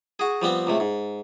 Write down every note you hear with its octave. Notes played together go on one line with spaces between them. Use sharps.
F#4 G#4
F3 G3 B3 C4
C#2 C3 A3
G#2